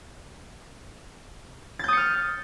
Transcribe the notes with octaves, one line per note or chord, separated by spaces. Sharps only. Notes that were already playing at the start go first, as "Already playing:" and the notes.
D#6 F6 G6 A6 C#7